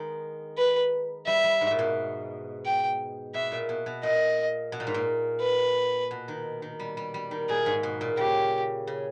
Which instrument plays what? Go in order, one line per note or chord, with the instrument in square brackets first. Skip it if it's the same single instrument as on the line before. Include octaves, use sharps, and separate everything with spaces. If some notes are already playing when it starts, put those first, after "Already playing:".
Already playing: [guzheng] D#3 G#3 B3
[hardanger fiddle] B4
[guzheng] G3 [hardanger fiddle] E5
[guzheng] G3
G#2
A#2
B2
[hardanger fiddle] G5
[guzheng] B2 [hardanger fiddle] E5
[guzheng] A#2
B2
B2
[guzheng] A#2 [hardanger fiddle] D#5
[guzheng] B2
A#2
G#2
A#2
[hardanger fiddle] B4
[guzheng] B2
D#3
D#3
G3
G3
G3
D#3
[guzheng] A#2 [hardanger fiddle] G#4
[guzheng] G#2
B2
A#2
[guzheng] C#3 [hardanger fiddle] G4
[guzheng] C#3